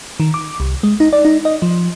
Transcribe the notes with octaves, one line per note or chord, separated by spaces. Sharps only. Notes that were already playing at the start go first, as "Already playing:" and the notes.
D#3
D6
C2
G#3
D#4
D5
D#4
D#5
F3